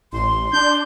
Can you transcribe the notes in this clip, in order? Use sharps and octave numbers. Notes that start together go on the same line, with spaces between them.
A1 C6
D4 G6